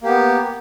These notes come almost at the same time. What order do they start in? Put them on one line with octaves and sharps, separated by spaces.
A#3 G4 B3